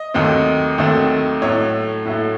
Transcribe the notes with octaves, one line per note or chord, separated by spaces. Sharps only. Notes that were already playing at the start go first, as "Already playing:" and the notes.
Already playing: D#5
D#2 D#3 F#3 A3 C4
D#2 D#3 F#3 A3 C4
A2 F#3 A3 C#5
A2 F#3 A3